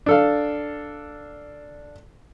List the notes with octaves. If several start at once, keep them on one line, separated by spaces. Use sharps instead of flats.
D4 A4 F5